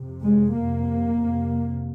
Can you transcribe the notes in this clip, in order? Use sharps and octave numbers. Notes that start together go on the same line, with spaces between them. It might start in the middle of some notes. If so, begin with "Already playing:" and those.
Already playing: F2 C3
G#3
F2 C3 A#3
F2 C3